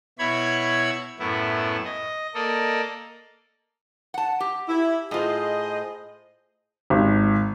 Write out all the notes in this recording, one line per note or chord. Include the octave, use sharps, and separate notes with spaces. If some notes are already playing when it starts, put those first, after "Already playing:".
B2 E4 C#5 B5 G#6
F#2 A2 B3 E4
D#5
A#3 A4 D5 D#5
F#5 A5
G4
E4
A2 F4 G#4 C5 D#5
G#1